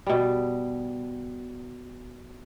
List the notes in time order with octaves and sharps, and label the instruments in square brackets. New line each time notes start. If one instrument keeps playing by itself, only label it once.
[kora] B2 G3